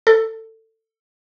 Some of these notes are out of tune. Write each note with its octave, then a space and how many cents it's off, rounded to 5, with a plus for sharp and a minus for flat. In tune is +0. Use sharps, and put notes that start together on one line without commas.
A4 +20